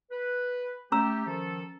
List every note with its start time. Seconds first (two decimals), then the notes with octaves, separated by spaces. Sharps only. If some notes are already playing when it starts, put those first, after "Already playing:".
0.11 B4
0.92 A3 C#4 G4 A#5 E6
1.26 D#3 F3 A4